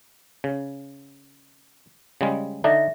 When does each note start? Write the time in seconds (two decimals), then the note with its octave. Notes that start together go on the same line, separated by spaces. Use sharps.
0.44 C#3
2.21 C#3 G3 G#3
2.64 D3 D4 D#4 E5 A#6